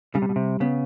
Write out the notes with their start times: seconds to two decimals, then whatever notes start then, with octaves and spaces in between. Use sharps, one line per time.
0.15 C#3 G3
0.22 C3
0.29 B2
0.36 C3
0.60 C#3 B3